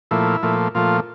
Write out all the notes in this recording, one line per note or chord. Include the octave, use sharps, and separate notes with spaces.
A#2 F3 A3 E4
A#2 F3 A3
A#2 F3 A3 F4